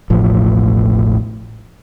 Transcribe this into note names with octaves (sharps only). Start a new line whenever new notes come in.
E1 A1 A2 F3